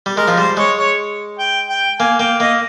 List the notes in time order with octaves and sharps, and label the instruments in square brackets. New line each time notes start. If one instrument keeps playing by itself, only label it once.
[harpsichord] G3
[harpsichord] G#3 [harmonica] A#4
[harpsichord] F3
[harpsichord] G3 [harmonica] C5
[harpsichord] G#3 [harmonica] C#5
[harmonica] C#5
G5
G5
[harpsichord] A#3 [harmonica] G#5
[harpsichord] A#3 [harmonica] G5
[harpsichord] A#3 [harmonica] D#5